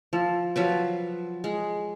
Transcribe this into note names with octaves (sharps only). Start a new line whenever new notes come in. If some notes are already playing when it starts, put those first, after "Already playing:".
F3
F3 F#3 B4
G#3